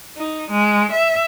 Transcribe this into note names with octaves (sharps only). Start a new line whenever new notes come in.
D#4
G#3
E5